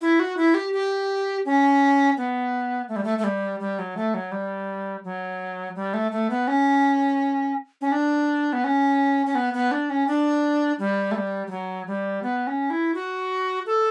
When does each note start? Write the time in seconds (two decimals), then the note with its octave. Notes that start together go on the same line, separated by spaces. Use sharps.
0.01 E4
0.20 F#4
0.37 E4
0.54 G4
0.73 G4
1.45 C#4
2.17 B3
2.88 A3
2.96 G3
3.04 A3
3.18 A3
3.24 G3
3.60 G3
3.79 F#3
3.97 A3
4.14 F#3
4.32 G3
5.04 F#3
5.75 G3
5.94 A3
6.12 A3
6.30 B3
6.48 C#4
7.81 C#4
7.92 D4
8.53 B3
8.64 C#4
9.26 C#4
9.35 B3
9.54 B3
9.71 D4
9.90 C#4
10.08 D4
10.79 G3
11.11 A3
11.16 G3
11.47 G3
11.50 F#3
11.87 G3
12.23 B3
12.47 C#4
12.70 E4
12.95 F#4
13.66 A4